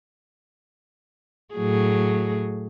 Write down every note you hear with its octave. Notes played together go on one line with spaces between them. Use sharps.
A2 F#3 G#4